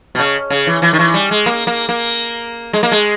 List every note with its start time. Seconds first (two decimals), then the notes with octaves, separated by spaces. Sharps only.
0.15 B2
0.19 C#3
0.50 C#3
0.67 E3
0.82 E3
0.93 D#3
0.99 E3
1.14 G3
1.31 G#3
1.46 A#3
1.67 A#3
1.89 A#3
2.73 G#3
2.83 A#3
2.92 G#3